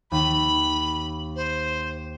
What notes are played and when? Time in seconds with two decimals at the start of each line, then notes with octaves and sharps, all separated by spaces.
0.12 D#2 B5
1.36 C5